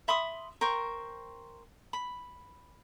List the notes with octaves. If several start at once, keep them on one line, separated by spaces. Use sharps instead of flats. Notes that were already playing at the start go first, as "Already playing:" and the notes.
E5 B5 C6 D#6
A#4 C5 G5 C#6
B5